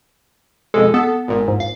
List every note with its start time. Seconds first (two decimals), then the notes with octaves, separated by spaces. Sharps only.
0.74 F2 B2 G#3 A4
0.94 B3 A4
1.28 G#1 A#2
1.48 G#2
1.60 F5